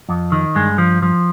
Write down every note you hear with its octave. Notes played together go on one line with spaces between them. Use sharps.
F2
D#3
G2 G#3
F3
F3